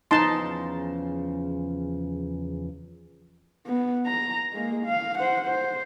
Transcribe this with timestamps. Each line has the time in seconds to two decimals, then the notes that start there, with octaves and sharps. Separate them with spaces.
0.11 E2 C#3 F3 D#4 A5 C6
3.66 B3
4.07 A#5
4.53 G#3 A#3
4.86 F5
5.18 C5 F#5
5.47 C5